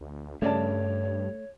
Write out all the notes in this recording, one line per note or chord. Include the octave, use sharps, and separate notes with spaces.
D2
G2 C#3 A3 C#5 D5 A5